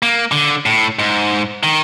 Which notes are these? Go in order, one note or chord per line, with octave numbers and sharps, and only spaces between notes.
A#3
D3
A2
G#2
D#3